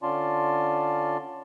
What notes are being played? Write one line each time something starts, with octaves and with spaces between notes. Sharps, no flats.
D3 C#4 F4 D5 A5 C6